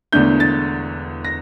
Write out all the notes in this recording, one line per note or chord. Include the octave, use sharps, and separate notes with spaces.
E1 E2 D3 A3 D4 G6
A6
A#6